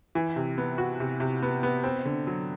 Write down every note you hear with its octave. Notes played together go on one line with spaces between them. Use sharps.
E3
C3
B3
F#4
C3
C3
B3
B3
C4
D3
F#3